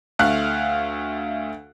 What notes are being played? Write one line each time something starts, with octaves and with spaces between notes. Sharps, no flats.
D2 A3 F5 F#6